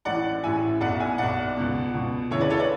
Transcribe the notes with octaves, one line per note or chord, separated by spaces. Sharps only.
A1 A2 E3 D5 F#5
A1 A2 E3 E5 G#5
B1 B2 D5 F#5
E5 G#5
B1 B2 D5 F#5
C#2 B2
C#2 B2
D2 C#3 E3 C#5 E5
B4 D5
A4 C#5
B4 D5